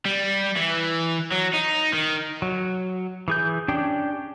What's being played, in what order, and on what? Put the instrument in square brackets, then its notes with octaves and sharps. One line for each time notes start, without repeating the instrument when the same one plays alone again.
[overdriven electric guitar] G3
E3
F#3
D#4
D#3
[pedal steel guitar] F#3
E3 G#4 G6
C#4 D4 G4 G5